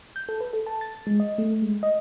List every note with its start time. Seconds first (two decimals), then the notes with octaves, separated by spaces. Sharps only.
0.16 G6
0.29 A4
0.41 B4
0.53 A4
0.66 A5
0.81 A6
1.07 G#3
1.20 D#5
1.38 A3
1.62 G#3
1.83 D#5